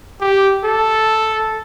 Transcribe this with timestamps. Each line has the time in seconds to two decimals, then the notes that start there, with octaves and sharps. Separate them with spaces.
0.21 G4
0.65 A4